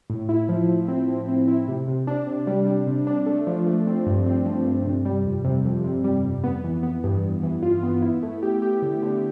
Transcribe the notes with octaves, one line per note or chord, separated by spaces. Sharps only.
A2
E4
F3
F3
C4
F3
C4
E4
C3
C3
D4
C3
G3
G3
C3
D4
A3
F3
A3
C4
G2
C4
F3
G2
C3
G3
F2
C3
F2
C3
G3
F2
B3
E3
B3
G2
G2
E3
F4
B3
E4
A3
G4
G4
D3
D3